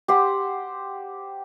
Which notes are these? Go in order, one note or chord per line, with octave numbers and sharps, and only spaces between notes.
G4 C5 F#5